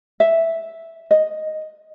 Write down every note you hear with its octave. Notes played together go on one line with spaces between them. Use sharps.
E5
D#5